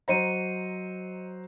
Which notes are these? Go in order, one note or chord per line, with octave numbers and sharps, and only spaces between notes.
F#3 C5 D#5 A#5 C#7 D#7